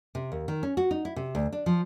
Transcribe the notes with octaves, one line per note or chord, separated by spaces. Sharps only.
C3
D#2
D#3
C#4
F#4
D#4
E4
C3
D2
D4
F3